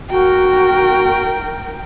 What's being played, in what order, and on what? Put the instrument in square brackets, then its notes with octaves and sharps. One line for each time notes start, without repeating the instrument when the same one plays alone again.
[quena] F#4 [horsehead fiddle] A#4 G5